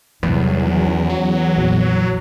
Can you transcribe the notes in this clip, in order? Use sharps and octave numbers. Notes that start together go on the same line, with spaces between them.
E2 C3 D#3 F#3 G3
C#4
E2 F#3
A#1 F2